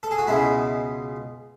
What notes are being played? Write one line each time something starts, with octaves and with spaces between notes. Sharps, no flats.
A4
G#4
F#4
C#2 B2 G#3 E4